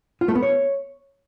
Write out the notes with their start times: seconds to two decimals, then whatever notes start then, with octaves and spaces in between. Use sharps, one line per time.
0.21 F4
0.28 A3
0.35 B3
0.43 C#5